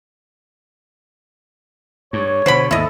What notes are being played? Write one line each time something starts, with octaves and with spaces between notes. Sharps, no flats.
G2 C#5
B2 D3 C5 F#5 B5
D#2 G#2 E4 A4 D#5